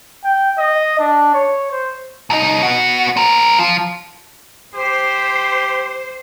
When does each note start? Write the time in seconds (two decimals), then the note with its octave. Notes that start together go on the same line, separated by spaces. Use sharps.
0.24 G5
0.58 D#5
1.00 D4
1.34 C#5
1.72 C5
2.30 C2 D#4
2.63 B3 F#4
3.17 C4 A#4
3.59 F3
4.75 G4 C5